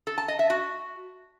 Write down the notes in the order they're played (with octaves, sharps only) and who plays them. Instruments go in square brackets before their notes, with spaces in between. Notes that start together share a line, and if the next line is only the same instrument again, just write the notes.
[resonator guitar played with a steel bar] A4
A5
D#5
E5
F#4